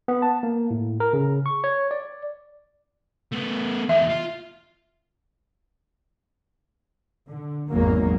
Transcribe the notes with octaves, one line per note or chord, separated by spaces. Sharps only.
B3
A5
A#3
A2
A#4
C#3
C#6
C#5
D5
A3 B3
E2 D#4 E5
F4
D3
G#1 E2 F#3 G#3 A#3